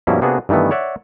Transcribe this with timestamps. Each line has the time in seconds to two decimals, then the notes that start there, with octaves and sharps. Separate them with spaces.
0.07 G2 B2 F3 A#3 C#4 E4
0.21 C3 A#3 B3 D4 F#4 G#4
0.49 G2 D#3 E3 A3 B3
0.71 C#5 D5 E5 F#5